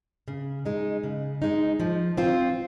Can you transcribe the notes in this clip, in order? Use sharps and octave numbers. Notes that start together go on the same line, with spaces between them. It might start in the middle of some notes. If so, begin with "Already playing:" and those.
C#3
G#3 D#4
C#3
G#3 D#4
F3
C4 F4 C5